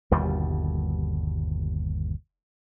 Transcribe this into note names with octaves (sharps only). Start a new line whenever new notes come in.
G1 D#2 B2 G3